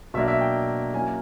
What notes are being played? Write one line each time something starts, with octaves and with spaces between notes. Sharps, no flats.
B2 F#3 A#3 D4 E5
E5
G5
F#3 A#3 C#4 E4 G#5